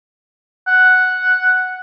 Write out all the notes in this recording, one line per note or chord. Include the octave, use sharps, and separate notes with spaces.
F#5